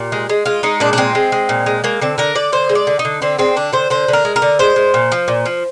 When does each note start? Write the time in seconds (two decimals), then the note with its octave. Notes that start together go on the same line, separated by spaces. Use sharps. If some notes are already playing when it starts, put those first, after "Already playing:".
Already playing: A#2 G4
0.12 G#3
0.29 G#3
0.45 G#3 F4
0.63 G#3 D#4
0.80 A#2 D4
0.93 D4
0.98 G#3 C4
1.15 G#3
1.32 G#3
1.49 A#2
1.66 G#3
1.84 G#3 A#3
2.01 D3 C4
2.18 D3 A#4
2.35 D3 D5
2.52 D3 C5
2.69 G#3
2.75 D5
2.87 D3
2.99 D#4
3.05 D3
3.22 D3 C4
3.38 G#3 C4
3.56 D3 D4
3.73 D3 C5
3.90 D3 C5
4.08 D3
4.13 A#4
4.25 G#3
4.36 A#4
4.42 D3
4.59 G#3 C5
4.76 G#3
4.94 A#2
5.12 F3
5.28 A#2
5.46 F3